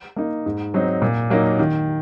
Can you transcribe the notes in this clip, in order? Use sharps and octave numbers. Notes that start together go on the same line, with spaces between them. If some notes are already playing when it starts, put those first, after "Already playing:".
A#3 D#4
G#2
F#3 C4 D#4
A#2
F#3 A#3 D#4
D#3